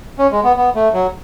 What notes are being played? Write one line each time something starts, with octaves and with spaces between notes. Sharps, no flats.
C#4
G#3
B3
B3
A3
F#3